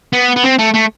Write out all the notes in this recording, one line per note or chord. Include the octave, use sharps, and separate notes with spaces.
B3
B3
C4
A3
A3